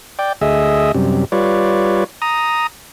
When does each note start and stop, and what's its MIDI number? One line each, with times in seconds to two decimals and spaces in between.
0.19 0.33 74
0.19 0.33 79
0.41 0.92 38
0.41 0.92 68
0.41 0.92 75
0.41 0.92 76
0.94 1.25 42
0.94 1.25 48
0.94 1.25 55
1.32 2.04 55
1.32 2.04 65
1.32 2.04 71
1.32 2.04 73
1.32 2.04 74
2.22 2.67 82
2.22 2.67 87